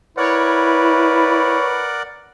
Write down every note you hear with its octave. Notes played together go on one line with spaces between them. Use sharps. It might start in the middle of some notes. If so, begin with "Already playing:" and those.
E4 A#4 B4 C#5 D5 F#5